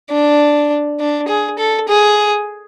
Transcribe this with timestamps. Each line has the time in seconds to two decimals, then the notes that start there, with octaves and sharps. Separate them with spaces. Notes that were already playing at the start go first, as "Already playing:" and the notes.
0.10 D4
1.00 D4
1.28 G#4
1.58 A4
1.88 G#4